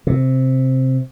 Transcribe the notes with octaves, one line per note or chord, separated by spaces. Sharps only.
C3